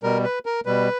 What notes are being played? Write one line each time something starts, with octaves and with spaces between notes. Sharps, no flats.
B2 G3 A#4
B4
A#4
B2 G3 B4